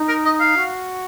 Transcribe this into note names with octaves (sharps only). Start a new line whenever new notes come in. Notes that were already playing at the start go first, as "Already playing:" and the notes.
Already playing: D#4
A#4
D#5
F5
F#4